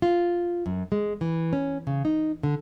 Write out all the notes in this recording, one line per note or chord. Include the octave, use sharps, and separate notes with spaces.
F4
F#2
G#3
E3
C#4
C#3
D#4
D3